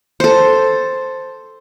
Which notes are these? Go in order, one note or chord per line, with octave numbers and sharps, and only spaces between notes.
A4 C5